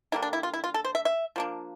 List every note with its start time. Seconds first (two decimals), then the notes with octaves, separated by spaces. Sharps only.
0.12 D3 G3 A#3 D4 E4
0.22 D4
0.33 E4
0.43 F4
0.54 E4
0.64 F4
0.74 A4
0.84 C5
0.95 E5
1.05 E5
1.36 F3 A#3 D4